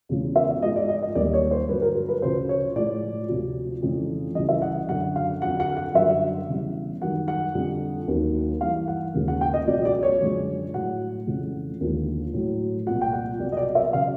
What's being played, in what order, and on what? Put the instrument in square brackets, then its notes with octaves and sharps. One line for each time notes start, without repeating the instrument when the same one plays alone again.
[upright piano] E2 C#3 F3 G#3
E5
G#2 F3 G#3 D#5
D5
D#5
D#5
D#2 D#3 G3 D5
C#5
C5
G2 D3 F#3 B4
A#4
A#4
B4
D2 C#3 F3 C5
C#5
A2 F3 G#3 D5
D2 C3 F3
F2 C#3 E3 G#3
C#2 C#3 E3 G3 D#5
E5
F#5
F#2 D3 F#3 F#5
F5
F2 D3 F#3 F#5
F#5
F#5
F#2 D3 G3 E5
E2 C#3 E3 G3
F#2 D#3 G3 F#5
F#5
F2 D3 G3
D#2 D#3 F#3
G2 E3 G3 F5
F#5
D#2 C#3 F3 G#3
F#5
G5
D#5
C#2 B2 F#3 D5
D5
C#5
F#2 D3 F3 G#3
A2 F#3 F#5
F2 C#3 E3 G#3
D#2 D3 F3 G#3
A2 F#3
C2 A#2 F3 F#5
G5
F#5
C2 B2 F#3 D5
D#5
D5
E5
C#3 F#3 F5